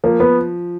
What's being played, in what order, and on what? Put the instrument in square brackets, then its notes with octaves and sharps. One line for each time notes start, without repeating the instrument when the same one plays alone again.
[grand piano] F3 [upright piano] A#3
[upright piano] B3